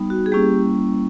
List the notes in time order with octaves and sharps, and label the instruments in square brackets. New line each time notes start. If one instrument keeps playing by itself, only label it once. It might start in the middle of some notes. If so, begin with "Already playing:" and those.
Already playing: [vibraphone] G3 B3 D#4
F#4
G#4
G3 A#3 C#4 E4 G4